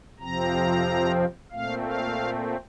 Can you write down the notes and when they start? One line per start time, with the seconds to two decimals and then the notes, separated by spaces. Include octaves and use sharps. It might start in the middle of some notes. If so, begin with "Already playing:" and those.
0.20 F2 C3 F3 C4 A#5
1.51 A#2 A3 C4 F5
1.84 F5